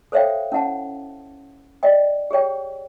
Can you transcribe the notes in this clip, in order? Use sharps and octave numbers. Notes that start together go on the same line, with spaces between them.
A4 C5 C#5 E5 F5 G5
C#4 E4 F#5 A5
D5 D#5 G5
G4 G#4 C#5 G5